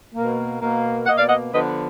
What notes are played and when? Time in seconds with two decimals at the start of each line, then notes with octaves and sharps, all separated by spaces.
0.15 B2 A#3
0.61 B2 A#3
1.06 B2 A#3 D#5 F#5
1.18 D5 F5
1.29 D#5 F#5
1.53 D3 F3 B3 B4 D#5